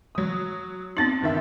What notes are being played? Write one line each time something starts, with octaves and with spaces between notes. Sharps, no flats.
F#3 D#6
B3 C4 D#4 A6 F#7
G1 D#3 E5